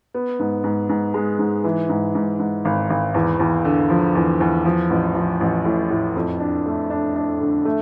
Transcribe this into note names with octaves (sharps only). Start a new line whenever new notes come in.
B3
G#2
G#2
G#2
G#3
G#2
E3
G#2
G#2
G#2
G#1
G#1
E2
E2
D3
F3
E2
E2
F3
A1
F3
A1
A2
A2
F2
D4
A3
D4
D4
D3
A3